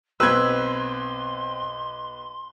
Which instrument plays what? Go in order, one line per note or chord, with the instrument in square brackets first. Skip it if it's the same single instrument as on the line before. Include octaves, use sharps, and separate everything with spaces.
[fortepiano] B1 B4 [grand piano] C4 F#6 G#6 [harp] B5 E6 [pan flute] C6